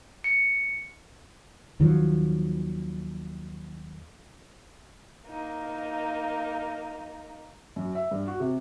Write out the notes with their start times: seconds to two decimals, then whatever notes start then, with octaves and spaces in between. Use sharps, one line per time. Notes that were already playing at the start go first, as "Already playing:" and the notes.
0.24 C#7
1.80 D#2 D#3 F3 F#3
5.27 A#3 D#4
7.76 F#2
7.95 E5
8.11 G2
8.27 F#4
8.40 C3